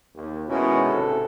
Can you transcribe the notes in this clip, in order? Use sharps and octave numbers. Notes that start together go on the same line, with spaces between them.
D#2
B2 D#3 G#3 C#4 E4 F#4
G#1 C3 A4